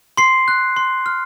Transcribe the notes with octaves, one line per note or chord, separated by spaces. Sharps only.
C6 C7
F#6
C6
F6